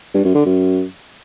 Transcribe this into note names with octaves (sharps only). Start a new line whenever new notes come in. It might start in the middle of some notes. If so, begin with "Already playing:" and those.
G2
F#2
D3
F#2